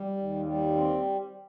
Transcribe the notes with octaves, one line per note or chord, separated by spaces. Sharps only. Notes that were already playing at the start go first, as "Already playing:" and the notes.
Already playing: G3
D#2
G3
C4